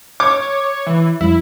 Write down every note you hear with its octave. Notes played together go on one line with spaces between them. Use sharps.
C#5 D6
E3
F2 G3 E4